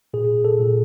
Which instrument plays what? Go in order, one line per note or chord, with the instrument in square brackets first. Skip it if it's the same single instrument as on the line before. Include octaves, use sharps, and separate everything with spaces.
[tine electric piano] A#2 G#4
A4
A#2